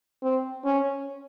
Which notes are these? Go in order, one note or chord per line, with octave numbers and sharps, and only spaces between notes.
C4
C#4